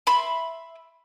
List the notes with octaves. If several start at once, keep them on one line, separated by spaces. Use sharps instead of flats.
E5 B5 C6